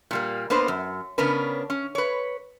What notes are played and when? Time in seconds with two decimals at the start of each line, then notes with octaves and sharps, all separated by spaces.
0.11 A#2 G3 A#3
0.50 A#3 B3 D4 B4 C5
0.68 F#2
1.18 C#3 B3 C#4 D4 A#4 B4
1.70 C#4
1.95 B4 C#5